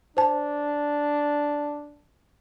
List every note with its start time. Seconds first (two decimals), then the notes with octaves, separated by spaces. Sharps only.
0.17 D4 C5 A5